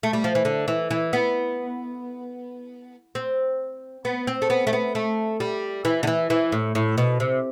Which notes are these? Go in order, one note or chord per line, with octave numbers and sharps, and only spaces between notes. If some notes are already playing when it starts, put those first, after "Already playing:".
A3
G3
F3
E3
D3
E3
E3
B3
C4
B3
C4
A3
B3
A3
B3
A3
G3
E3
D3
E3
E3
A2
A2
B2
C3